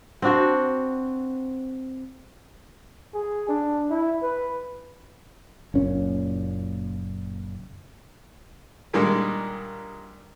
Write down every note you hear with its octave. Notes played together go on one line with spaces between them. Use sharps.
C4 D4 F#4 C5
G#4
D4
E4
B4
F#1 A#2 C#4
A#2 D#3 G3 G#3 D4